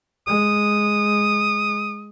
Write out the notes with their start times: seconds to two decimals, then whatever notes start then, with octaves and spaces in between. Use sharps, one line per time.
0.27 G#3 D#6